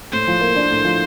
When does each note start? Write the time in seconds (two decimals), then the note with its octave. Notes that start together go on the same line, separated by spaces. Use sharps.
0.12 A2 C5
0.27 F3
0.41 A#3
0.56 D4
0.71 A2
0.85 F3